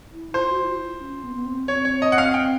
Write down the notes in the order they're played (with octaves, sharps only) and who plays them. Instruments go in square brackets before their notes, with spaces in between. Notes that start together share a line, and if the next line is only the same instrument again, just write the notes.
[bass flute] E4
[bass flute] F4 [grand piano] C5
[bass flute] F#4
E4
F4
E4
F4
C#4
B3
B3
C4
[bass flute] C4 [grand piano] C#5
[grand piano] C#5
D#5
F#5
F5
G5